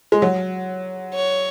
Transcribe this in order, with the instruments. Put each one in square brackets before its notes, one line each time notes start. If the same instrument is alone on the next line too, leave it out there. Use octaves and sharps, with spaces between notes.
[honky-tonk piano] G#3
F#3
[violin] C#5